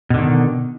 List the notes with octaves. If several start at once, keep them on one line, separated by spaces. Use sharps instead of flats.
B2 D3 D#3